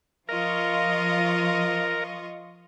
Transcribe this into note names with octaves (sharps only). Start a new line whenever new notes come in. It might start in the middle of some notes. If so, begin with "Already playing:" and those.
F3 F4 A#4 D#5 C#6